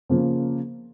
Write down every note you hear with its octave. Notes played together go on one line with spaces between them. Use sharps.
C#3 F3 A#3